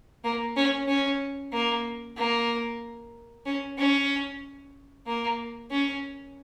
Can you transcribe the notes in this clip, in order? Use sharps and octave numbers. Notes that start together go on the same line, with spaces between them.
A#3
C#4
C#4
A#3
A#3
C#4
C#4
A#3
C#4